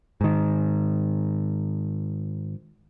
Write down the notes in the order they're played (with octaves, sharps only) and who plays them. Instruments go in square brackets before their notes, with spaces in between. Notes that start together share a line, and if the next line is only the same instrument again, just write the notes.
[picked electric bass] G#2 D#3